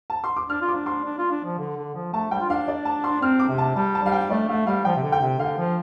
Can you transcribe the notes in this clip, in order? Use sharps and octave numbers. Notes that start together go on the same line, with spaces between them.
A5
C6
D6
D4 F6
F4
D6
D4
C6
D4
F4
D4
F3
D3
D3
F3
A3 A5
G3 G5
F4
D4 F5
D5
A5
C6
C4 F6
D6
C3
A5
G3 A5
A5
G3 F5
G5
A3 D5
A3 F5
G3 F5
F3 G5
C3
D3
G5
C3
D3 F5
F3